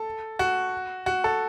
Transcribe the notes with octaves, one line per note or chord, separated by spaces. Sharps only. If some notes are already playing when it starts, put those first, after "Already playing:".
Already playing: A4
F#4
F#4
A4